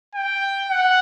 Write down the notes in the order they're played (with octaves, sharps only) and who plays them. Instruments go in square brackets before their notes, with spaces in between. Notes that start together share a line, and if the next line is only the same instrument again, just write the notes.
[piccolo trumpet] G5
F#5